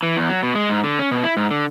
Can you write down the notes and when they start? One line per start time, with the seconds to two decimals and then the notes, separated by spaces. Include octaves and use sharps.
0.03 E3
0.17 E2
0.29 F#3
0.43 B2
0.55 G#3
0.70 G#2
0.84 D3
0.99 C#4
1.11 B2
1.24 E4
1.37 G#2
1.51 D3